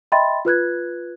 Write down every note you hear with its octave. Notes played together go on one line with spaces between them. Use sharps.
D#5 E5 G5 B5 C6 A6
F4 B4 F#6 G#6